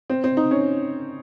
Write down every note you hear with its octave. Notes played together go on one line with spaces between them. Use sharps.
C4
C4
D#4
C#4